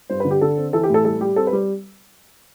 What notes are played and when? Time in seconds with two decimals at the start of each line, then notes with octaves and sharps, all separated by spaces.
0.10 G2 C5
0.20 B4
0.25 D3
0.31 G4
0.41 D3 A4
0.57 C4
0.73 E3 A4
0.83 G4
0.89 A2 A4
1.05 G3 A4
1.21 G3 G4
1.36 C4 A4
1.47 B4
1.53 G3